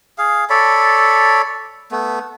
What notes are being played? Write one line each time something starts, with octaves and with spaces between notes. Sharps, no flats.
G#4 F5
A4 C#5 D5 B5
A3 B3